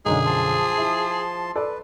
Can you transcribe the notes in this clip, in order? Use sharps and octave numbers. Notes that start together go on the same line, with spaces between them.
B1 F#2 D3 F#3 G#3 D#4 G#4
F3 A5 C6
E4
A4 B4 D5